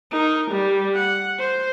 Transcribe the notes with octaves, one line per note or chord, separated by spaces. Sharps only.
D#4 A#4
G3
F#5
C5